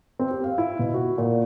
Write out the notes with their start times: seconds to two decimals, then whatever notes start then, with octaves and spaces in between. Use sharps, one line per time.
0.19 C4
0.31 G4
0.44 F5
0.58 E4
0.79 B2
0.94 F#4
1.18 A#2